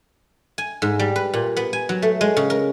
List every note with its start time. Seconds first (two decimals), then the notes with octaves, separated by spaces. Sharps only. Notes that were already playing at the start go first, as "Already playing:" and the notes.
0.58 G#5
0.82 G#2
0.99 G3
1.16 B4
1.34 A#2
1.57 B3
1.73 G#5
1.89 F#3
2.02 A3
2.21 G#3
2.37 C#3
2.50 A#4